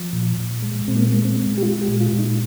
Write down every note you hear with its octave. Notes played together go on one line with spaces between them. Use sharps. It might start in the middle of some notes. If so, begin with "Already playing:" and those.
Already playing: F3
A#2
A#2
G#3
A#2 C4
A#3
G#3 A#3
C4
G#3
G4
G#3 F4
G4
A#2
F4
A#2
D#4